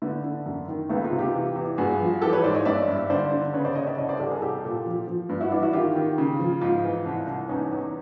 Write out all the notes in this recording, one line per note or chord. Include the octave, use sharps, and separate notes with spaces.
D3 A3 B3
D3
F#2
D#3
C#2 A3 B3
D#4 F4
C3
F4 G4
E3
E2
G2 F#4 G#4
F3
E3 G4 A4
B4 C#5
G#2 C5 D5
C#5 D#5
G2 D5 E5
G2
D3 C5 D5
D3
C#3 B4 C#5
C5 D5
C#3 C#5 D#5
D5 E5
C2 C#5 D#5
C5 D5
C2 G4 A4
G#4 A#4
C2 G4 A4
A#2
F3
F3
G2
E4 F#4
E3 D4 E4
E4 F#4
D#3 F4 G4
D#3
C#3
F3
G#2 D#4 F4
E3
C2
C2
E2 C#4 D#4
E2